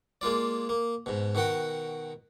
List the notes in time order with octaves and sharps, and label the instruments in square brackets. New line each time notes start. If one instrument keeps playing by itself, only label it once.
[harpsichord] G#3 A#3 F4 D5
A#3
G#2 B2
B2 D#3 F#4 F#5 G5